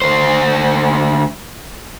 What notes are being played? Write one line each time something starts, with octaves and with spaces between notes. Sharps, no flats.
D2 C5